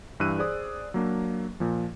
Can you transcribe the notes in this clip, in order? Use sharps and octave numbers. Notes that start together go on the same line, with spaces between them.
G2 E3 E6 F#6 D#7
G#4 C5 D5 D#6
F#3 A#3 D4
A#2 F3